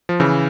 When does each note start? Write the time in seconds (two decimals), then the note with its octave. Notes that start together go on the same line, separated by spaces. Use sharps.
0.09 F3
0.20 C#3 E3